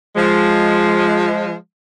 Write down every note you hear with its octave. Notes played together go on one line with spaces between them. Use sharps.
F3 G#3